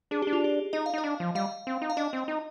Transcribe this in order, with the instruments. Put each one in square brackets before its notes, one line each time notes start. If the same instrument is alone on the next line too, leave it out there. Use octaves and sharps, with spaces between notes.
[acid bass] D4 [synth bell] G#4
[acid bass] D4 [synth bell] G4
[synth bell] F4
G4
[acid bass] D#4 [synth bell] D#5
[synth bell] F5
[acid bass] D#4 [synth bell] D#5
[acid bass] D4
F3
[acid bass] G3 [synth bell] F5
[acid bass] C4
D#4
[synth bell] F5
[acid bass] D4 [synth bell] D#5
[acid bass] C4
D#4